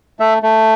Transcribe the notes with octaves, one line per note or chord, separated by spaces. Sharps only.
A3 E5
A3